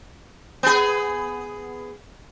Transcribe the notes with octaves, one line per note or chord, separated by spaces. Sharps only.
B3 G#4